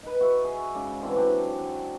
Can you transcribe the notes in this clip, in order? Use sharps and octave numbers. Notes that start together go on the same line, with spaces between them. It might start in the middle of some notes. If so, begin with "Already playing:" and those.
D#4 B4
F#4 E5 C#6
G#4
G#2 C#3 D5
D3 E3 C4 C#4
F#3 D4 F#4 G4